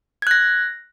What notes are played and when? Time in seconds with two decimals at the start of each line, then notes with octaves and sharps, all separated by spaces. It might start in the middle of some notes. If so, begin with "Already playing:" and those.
0.22 G#6
0.27 F#6
0.31 A#6